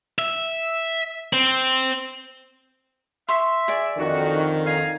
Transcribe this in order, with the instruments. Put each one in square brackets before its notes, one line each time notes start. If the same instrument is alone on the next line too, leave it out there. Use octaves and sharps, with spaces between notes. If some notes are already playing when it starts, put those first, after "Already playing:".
[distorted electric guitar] E5
C4
[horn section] E5 [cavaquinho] C6 C#6
[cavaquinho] G#4 D5
[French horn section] F2 D3 D#3 [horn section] F#4
[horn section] F5 G#5 A#5